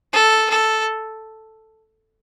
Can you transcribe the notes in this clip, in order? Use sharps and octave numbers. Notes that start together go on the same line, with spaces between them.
A4
A4